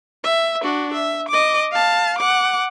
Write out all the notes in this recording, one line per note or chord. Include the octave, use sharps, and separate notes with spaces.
E5
D4 F#4
E5
D#5 D6
F5 A5
F#5 D6